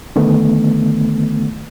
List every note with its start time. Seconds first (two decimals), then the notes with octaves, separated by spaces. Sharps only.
0.16 D3 D#3 A3 B3